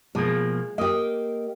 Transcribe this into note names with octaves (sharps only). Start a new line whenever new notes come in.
B2 F3 G#3 A#3
A#3 G4 D#5